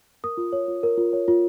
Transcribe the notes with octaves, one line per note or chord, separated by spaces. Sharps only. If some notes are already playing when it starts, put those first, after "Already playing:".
A#4 D#6
F4
C#5
F4
A#4
F4
C#5
F4